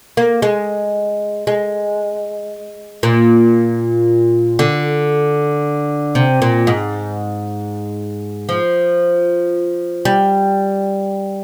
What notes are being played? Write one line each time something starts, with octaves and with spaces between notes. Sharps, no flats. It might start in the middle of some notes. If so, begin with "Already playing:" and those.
A#3
G#3
G#3
A#2
D3
C3
A#2
G#2
F3
G3